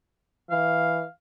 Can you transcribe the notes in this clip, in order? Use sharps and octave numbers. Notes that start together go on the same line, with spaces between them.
E3 F5